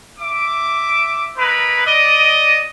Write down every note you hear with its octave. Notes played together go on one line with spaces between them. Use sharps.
E5 D6
D#4 E4 A#4 B4
D5 D#5